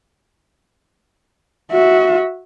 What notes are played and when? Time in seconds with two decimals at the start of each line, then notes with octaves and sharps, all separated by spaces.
1.72 F#4 E5